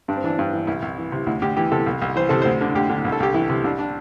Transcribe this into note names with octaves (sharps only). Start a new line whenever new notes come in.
G2 D4
C4
E3 D4
G2
E3
C2 E4
C2
E3
C3
D2 E4
D2 G4
E3 G4
C3 A4
C2
C2
E3 C5
C3 A4
D2 C5
D3
D2 G4
D3
C2
A4
C2 G4
E3 E4
C3
C2 D4
D4